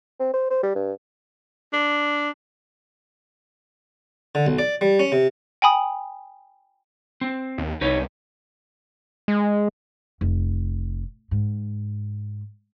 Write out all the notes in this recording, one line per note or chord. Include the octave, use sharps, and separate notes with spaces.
C4
C5
C5
G3
G2
D4
D3
B1
D5
G3
C#4
C3
G5 G#5 B5 D#6
C4
D#2
C2 D#4 B4 C#5
G#3
F1
G#2